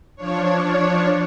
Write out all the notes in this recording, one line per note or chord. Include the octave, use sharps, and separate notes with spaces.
F3 D4 C#5